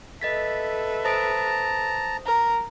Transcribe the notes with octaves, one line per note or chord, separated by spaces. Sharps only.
A4 B4 D#5 E5 A6 B6
C5 A5 A#5 D#6 D7
A#4